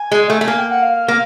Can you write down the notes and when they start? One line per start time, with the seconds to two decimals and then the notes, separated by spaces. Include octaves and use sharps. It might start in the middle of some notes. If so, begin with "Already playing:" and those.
Already playing: G#5
0.11 G#3
0.30 A3
0.41 A3
0.47 A#3 G#5
0.59 G5
0.71 F#5
0.83 F5
1.08 A#3